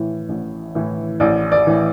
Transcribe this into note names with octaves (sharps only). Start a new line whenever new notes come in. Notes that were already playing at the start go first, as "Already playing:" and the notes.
Already playing: A2 E3
A1
A2 E3
A1 D5
D5
A2 E3